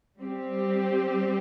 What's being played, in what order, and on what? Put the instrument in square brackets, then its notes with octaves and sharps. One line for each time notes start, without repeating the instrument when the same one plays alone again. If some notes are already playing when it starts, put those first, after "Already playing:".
[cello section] G3 C4 G4